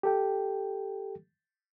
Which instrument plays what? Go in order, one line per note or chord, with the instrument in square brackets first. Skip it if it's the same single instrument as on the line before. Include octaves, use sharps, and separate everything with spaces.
[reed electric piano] G4 A4 G5